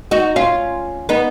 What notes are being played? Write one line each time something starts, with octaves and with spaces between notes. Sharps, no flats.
D#4 F#4
C#4 F4
B3 D#4